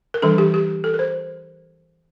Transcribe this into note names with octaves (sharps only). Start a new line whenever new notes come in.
A#4
E3 G3 D4 A4
G4
G4
A4
A#4
C5